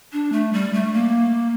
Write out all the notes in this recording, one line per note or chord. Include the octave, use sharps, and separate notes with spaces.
D4
A3
G3
A3
A#3